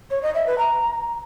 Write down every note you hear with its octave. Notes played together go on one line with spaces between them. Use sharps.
C#5
D#5
E5
B4
A#5